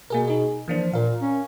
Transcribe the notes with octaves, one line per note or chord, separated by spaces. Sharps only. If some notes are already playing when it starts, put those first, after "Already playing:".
B2 A#3 G#4 A#4
D#4 G#4
E3 F3 A#3 D4
A#2 A#4 F5
C#4